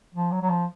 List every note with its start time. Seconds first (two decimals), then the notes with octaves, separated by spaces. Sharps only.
0.14 F3
0.32 F#3
0.42 F#3
0.49 F3